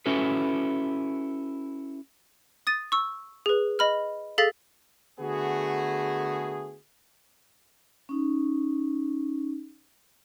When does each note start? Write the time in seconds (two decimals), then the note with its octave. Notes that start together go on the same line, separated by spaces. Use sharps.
0.06 C#4 E4 F#4 A4 B4
2.67 D#6 A6 D#7
2.92 C#6 E6
3.46 G#4 B4
3.79 D#5 B5 F6
4.38 G#4 A4 F5 A6 B6
5.19 D3 A3 B3 F#4 G#4
8.09 C#4 D#4